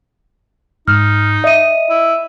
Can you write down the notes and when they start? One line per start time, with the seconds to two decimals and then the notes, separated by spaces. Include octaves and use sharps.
0.88 G#2 D#4 F6
1.44 D#5 E5 D#7
1.90 E4